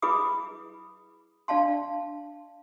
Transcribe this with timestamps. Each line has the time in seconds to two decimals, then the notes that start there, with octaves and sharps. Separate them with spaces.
0.02 E4 G#4 B4 B5 D6 D#6
1.48 D4 D5 F5 A5 C6